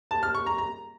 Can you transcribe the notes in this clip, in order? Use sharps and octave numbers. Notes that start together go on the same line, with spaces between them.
A5
F6
C#6
A#5
A#5